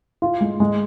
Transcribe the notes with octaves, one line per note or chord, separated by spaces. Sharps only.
F4
G#3
G#3